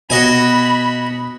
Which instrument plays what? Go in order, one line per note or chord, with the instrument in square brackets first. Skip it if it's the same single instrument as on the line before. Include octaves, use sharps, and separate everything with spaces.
[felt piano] B2 [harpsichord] F#4 D#5 G#5 [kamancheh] B5